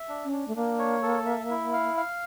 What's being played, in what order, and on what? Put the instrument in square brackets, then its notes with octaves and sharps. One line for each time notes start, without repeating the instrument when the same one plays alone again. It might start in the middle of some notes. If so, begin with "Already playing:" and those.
Already playing: [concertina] E5
D4
[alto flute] C#4
[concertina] D4
[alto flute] A3
[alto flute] A#3 [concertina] D4
[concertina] C#5
A4
E5
E4
F5
F5